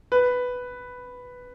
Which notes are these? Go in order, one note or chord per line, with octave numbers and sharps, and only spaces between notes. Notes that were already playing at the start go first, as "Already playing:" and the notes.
B4